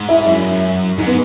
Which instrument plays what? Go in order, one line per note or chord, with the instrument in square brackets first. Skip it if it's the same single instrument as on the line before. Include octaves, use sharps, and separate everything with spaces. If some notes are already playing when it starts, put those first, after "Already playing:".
Already playing: [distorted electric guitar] G#2
[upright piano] E4
[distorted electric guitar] F#2 [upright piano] E4
[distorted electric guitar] G#2 [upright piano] D#4
[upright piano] B3